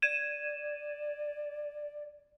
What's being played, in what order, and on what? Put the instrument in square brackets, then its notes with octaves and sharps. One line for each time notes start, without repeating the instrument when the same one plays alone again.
[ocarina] D5 [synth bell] G#6 D#7 E7